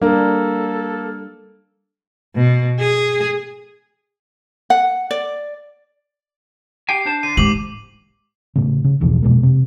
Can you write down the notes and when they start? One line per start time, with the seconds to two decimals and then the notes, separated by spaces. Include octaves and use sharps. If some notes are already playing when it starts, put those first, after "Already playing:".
0.02 G3 A#3 D4 A4
2.35 B2
2.79 G#4
4.70 F#5
5.11 D5
6.89 G4 G5 G#5 C7
7.05 D4 C5 A5
7.23 D3 D#7
7.37 G#2 G4 D6 F#7
8.55 A2 C#3
8.84 C#3
9.00 E1 B1 E2 F3
9.23 F2 B2 G#3 A#3
9.43 C3